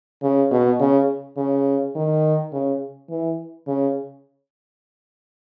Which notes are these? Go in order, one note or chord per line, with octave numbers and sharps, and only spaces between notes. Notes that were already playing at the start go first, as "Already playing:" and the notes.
C#3
B2
C#3
C#3
D#3
C#3
E3
C#3